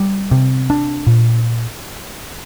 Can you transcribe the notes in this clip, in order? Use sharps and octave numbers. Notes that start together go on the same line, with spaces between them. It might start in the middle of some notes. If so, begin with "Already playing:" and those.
Already playing: G3
C3
D4
A#2